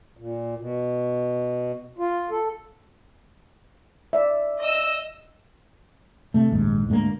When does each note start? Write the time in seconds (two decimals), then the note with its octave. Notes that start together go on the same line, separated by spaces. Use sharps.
0.17 A#2
0.58 B2
1.98 F4
2.31 A4
4.13 D5 E5
4.61 D#5 E6
6.34 C3 A3
6.51 A#1 D#2 G#2
6.89 D2 G#2 G#3 A#3